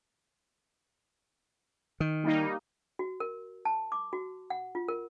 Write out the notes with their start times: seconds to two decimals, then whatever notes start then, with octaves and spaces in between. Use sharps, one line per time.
2.00 D#3
2.24 G3 A#3 D#4
2.99 F#4
3.20 A#4
3.65 A5
3.92 D6
4.13 F#4
4.50 F#5
4.75 F4
4.88 A#4